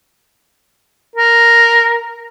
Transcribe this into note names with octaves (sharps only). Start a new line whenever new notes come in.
A#4